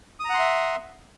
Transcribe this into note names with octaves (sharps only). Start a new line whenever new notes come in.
E5 F#5 A#5 C6 D#6